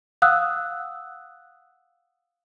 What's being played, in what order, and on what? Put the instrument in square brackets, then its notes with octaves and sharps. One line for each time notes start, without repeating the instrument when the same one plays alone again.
[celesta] F5 F#5 D#6 E6 F#6